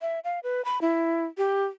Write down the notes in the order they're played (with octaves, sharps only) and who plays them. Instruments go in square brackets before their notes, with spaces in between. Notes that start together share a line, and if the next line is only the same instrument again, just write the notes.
[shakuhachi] E5
F5
B4
B5
E4
G4